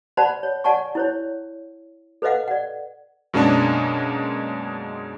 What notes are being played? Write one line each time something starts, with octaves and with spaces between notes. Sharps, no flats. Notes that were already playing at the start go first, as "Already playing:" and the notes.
C5 D5 F#5 A5 B5
C#5
D5 F#5 G#5 A5 C#6
E4 C5 C#5
A4 B4 C5 D#5 F5 F#5
D5 F#5
F#2 B2 G#3 A#3 C#4 D4